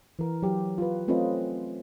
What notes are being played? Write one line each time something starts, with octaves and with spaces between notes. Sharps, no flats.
E3 A#4
F#3 G4
F4 B4
A3 C4 C#4 F4 B4 D#5